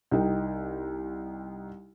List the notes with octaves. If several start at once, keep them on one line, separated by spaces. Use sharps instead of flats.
C2 D#4 G5